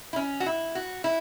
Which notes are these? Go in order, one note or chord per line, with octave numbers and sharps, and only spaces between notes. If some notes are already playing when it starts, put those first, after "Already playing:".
E4
C#4
F#4
E4
F#4
E4